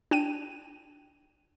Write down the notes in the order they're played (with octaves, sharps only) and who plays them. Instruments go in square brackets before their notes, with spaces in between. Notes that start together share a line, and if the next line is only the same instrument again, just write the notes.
[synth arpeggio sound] D4 G5 D#7